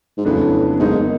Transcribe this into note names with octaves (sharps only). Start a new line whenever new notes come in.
G#2
F2 A2 C#3 F#3 B3 D4
G#2 B2 F#3 A#3 D#4